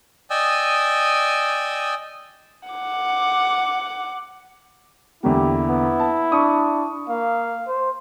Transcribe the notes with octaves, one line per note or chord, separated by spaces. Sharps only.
D5 D#5 G5 G#5 D#6 E6
F#5 D6
E2 D3 A#3 E4 G4
B3
A5
D4 C#6 D#6
A#3 F5
C5